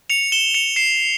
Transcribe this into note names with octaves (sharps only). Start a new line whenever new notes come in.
C#7 F7
E7 G7
C#7 F7
C7 E7